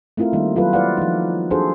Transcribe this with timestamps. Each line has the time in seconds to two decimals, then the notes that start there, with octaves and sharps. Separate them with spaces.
0.17 A3 C4 E4 F4 A#4
0.33 D#3 G3 A#3 D#4
0.56 F#3 F4 A4 B4
0.73 E4 B4 C5 D5 F5 F#5
0.97 F3 D#4
1.51 D4 F#4 G#4 A4 C5